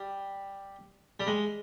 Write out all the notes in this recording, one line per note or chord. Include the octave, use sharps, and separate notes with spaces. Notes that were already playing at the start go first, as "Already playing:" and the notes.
Already playing: G3
G3
G#3